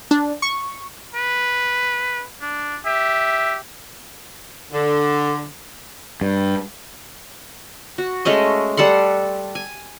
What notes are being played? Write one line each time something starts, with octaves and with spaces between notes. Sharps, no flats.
D4
C#6
B4
D4
G4 E5
D3
G2
F#4
G#3 A3 C#4 D#5
G3 A4 F#5 C6
G#5